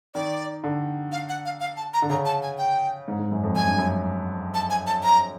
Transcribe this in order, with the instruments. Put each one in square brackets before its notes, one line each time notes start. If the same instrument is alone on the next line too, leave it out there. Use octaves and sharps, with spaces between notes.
[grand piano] D#3 [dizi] D5
[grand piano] D3
[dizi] F5
F#5
F5
F5
A5
A#5
[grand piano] D3
[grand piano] C#3 [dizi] A#5
[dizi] A5
G#5
G5
[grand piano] G#2
G#2
F#2
F2
[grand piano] F#2 [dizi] G#5
[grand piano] G2
F#2
[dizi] A5
G#5
A5
A#5